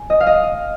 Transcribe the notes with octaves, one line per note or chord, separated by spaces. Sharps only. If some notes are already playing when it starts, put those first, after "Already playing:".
Already playing: G#5
D#5
F5
D#5